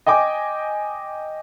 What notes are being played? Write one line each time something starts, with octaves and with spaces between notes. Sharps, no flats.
D#5 G5 G#5 D6